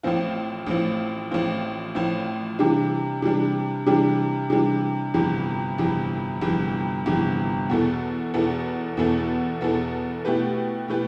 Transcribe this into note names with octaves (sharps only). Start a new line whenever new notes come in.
A1 A2 F3 C4 F4
A1 A2 F3 C4 F4
A1 A2 F3 C4 F4
A1 A2 F3 C4 F4
C3 E3 G3 D4
C3 E3 G3 D4
C3 E3 G3 D4
C3 E3 G3 D4
G1 F2 C3 E3
G1 F2 C3 E3
G1 F2 C3 E3
G1 F2 C3 E3
E2 B2 B3 E4 A4
E2 B2 B3 E4 A4
E2 B2 B3 E4 A4
E2 B2 B3 E4 A4
B2 A3 E4 G4 B4
B2 A3 E4 G4 B4